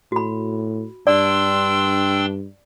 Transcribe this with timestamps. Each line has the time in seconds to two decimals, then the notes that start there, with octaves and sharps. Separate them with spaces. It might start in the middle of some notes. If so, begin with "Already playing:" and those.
0.12 A2 F#4 B5
1.07 G2 D4 D5 G5 C6 E6